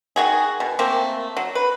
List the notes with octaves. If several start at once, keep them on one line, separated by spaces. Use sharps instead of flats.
D#3 F#4 G#4
B2
A3 A#3 C4
F#3
B4